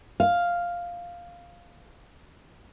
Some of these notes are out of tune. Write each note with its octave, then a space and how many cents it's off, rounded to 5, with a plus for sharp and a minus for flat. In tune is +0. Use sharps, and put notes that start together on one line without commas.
F5 +0